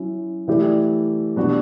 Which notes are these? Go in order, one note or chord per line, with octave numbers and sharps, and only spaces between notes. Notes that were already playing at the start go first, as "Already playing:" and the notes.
Already playing: F#3 C#4 E4
E3 A3 E4 G4 D5
B2 G3 D4 F#4